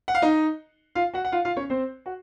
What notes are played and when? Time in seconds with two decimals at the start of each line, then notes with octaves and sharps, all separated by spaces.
0.08 F#5
0.15 F5
0.22 D#4 D#5
0.95 F4 F5
1.14 F#4 F#5
1.25 F#5
1.32 F4 F5
1.45 F4 F5
1.57 C#4 C#5
1.70 C4 C5
2.06 F#4